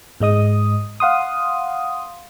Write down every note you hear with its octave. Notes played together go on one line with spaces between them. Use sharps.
G#2 G#3 D#5 D#6
F5 F#5 C6 D#6